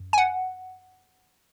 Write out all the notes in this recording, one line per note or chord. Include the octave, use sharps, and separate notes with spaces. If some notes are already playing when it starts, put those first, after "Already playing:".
Already playing: F#2
G#5
F#5